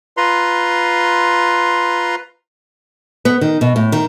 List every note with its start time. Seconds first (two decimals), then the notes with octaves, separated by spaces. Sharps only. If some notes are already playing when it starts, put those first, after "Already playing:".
0.17 F4 B4 A#5 C6
3.25 B3
3.41 D#3
3.61 B2
3.76 A2
3.92 D#3